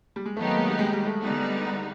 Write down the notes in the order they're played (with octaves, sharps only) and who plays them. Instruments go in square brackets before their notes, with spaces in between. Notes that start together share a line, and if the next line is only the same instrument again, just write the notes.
[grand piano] G3
G#3
[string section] D#3 F#3 B3 D#4 G4 [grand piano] A3
[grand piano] A#3
G#3
G3
G#3
G3
A3
[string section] D3 G3 B3 D#4